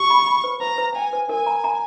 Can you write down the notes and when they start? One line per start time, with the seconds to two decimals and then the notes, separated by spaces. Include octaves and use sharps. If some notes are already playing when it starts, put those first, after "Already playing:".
Already playing: G4 C#6
0.10 B5
0.27 B5
0.44 B4
0.61 B4 A#5
0.78 B4
0.95 G5 G#5
1.13 B4
1.29 A#4 G#5
1.46 A#5
1.64 A#5